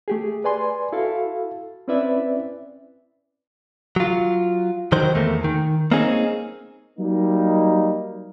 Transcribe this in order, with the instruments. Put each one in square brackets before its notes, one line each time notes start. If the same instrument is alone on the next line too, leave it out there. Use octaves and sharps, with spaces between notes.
[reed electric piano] A3 G4 G#4
B4 D5 G#5 C6
E4 F#4 A4 F5
C4 C#4 E4 B4 D5 E5
[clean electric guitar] F#3 F4
D#3 F#3 C5
E2 A3 A#3
D#3
A#3 C4 C#4 D#4 G#4
[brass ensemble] F#3 G3 A#3 D#4